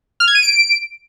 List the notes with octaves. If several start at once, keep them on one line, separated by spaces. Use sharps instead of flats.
F6
G#6
D#7
D7